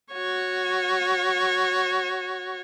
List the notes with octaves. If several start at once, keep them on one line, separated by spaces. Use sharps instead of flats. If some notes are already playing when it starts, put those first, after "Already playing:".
F#4 C#5